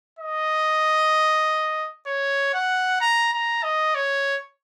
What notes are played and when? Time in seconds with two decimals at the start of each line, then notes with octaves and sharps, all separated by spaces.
0.19 D#5
2.06 C#5
2.54 F#5
3.01 A#5
3.33 A#5
3.63 D#5
3.95 C#5